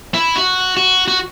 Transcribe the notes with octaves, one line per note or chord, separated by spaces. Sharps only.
E4
F#4
F#4
F#4